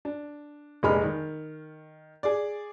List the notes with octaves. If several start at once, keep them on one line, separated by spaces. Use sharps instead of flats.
D4
F1 A#1 G#3 D#5 B5 F6
D#3
G#4 D5